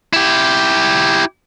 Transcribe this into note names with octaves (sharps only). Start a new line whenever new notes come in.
E4 G4